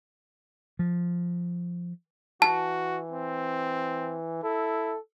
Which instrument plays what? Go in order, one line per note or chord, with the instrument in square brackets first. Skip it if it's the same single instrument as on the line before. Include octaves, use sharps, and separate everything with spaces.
[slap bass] F3
[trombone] E3 [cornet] F#4 [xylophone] A5
[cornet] C4
[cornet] E4 [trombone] A4